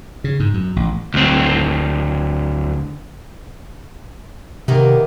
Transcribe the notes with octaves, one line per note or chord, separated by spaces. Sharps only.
C#3
G#2
F#2
A1
D2 C4
C3 D#3 A#3 B3